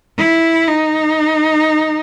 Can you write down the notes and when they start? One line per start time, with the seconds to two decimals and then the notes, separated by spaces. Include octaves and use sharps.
0.18 E4
0.68 D#4